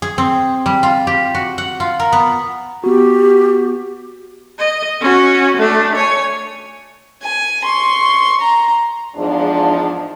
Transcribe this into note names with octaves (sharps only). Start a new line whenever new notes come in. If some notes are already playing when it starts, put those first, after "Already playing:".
G#4
C4
G3
F4
G4
F#4
F#5
F4
A#4
B3
B3 F#4 G4
D#5
C#4 F#4
A3 D4
C#5 G#5
G#5
C6 C#6
A#5
E2 G#2 F3 D4